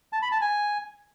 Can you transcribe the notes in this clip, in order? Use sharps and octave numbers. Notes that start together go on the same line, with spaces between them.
A5
B5
A5
G#5